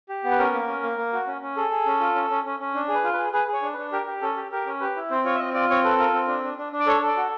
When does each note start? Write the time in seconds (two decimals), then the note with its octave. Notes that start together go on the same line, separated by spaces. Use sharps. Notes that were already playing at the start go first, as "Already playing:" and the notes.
0.09 G4
0.24 B3
0.31 B4
0.39 C#4 A#4
0.54 A#3
0.68 C#4
0.83 A#3
0.98 A#3
1.13 F#4
1.27 C#4
1.42 C#4
1.57 G#4 A4
1.71 G#4
1.86 C#4
2.00 F4
2.15 C#4
2.30 C#4
2.45 C#4
2.60 C#4
2.75 D4
2.88 G#4
2.94 B4
3.04 F4
3.13 B4
3.18 G#4
3.33 G#4 B4
3.48 G#4
3.53 C#5
3.62 D4
3.73 D4 B4
3.92 G4 A#4
4.07 G4
4.22 C#4 A4
4.37 G4
4.52 G4 A#4
4.66 C#4
4.80 G4 B4
4.96 E4
5.11 C4 C5
5.24 F4 C#5
5.35 E5
5.39 C4 D#5
5.54 F4 D5
5.69 C4 C#5
5.84 A4 B4
5.98 F4 A#4
6.13 C4
6.28 D4
6.43 D4
6.58 D4
6.72 D4
6.80 D5
6.87 A4 C#5
7.02 A4
7.07 D5
7.16 F#4